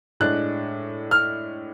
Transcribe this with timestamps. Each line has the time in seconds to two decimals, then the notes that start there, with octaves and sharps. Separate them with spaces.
0.20 A2 G#3 D4 F#6
1.11 F6